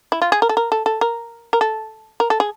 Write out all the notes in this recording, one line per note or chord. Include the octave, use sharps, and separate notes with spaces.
E4
F4
G#4
A#4
A4
A#4
A4
A4
A#4
A#4
A4
A#4
A4
G#4